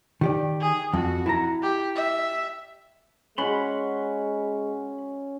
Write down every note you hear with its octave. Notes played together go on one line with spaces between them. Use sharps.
D#3 G4 D5
G#4
F2 F#4
E4 A5 A#5
G4
E5
G#3 C#4 F#4 F#5 B5 C6